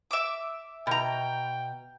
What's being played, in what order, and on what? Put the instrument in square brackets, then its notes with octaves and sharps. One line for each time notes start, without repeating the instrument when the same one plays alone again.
[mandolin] E5 D6
[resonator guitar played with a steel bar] B2 A#5 [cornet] G5